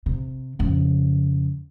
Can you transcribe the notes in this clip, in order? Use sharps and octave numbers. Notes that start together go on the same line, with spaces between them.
C3
F2 C#3